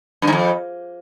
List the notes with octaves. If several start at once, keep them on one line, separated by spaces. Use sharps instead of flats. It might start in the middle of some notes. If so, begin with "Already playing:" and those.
G2
G#2
F2